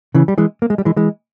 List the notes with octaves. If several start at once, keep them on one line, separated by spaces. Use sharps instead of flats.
C#3 E3
G3
E3 G#3
A#3
G#3
G3
E3 G#3
E3 G#3